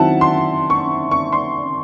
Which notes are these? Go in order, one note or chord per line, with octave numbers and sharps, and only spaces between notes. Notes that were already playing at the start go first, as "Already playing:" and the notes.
Already playing: D#3 F#3 C4 E4 E5 F#5 A5
C6
C#6
C#6
C6